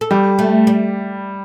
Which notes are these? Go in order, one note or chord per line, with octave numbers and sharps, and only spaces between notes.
A4
G3 G4
A3
G3